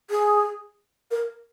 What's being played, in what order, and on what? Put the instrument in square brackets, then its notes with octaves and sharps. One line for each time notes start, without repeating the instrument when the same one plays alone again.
[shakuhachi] G#4
A#4